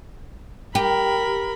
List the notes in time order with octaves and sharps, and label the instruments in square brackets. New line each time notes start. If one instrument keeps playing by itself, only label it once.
[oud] G4 [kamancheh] A#4 B5